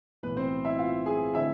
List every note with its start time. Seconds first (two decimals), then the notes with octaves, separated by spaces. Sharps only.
0.23 B1 A2 E3 B3 B4
0.37 C4 C5
0.65 E4 E5
0.78 F4 F5
1.06 G#4 G#5
1.34 D3 A3 C4 E4 E5